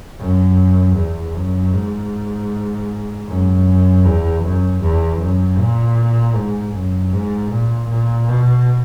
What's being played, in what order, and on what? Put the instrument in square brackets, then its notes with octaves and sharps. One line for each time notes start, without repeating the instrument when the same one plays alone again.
[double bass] F#2
E2
F#2
G#2
F#2
E2
F#2
E2
F#2
A#2
G#2
F#2
G#2
A#2
A#2
B2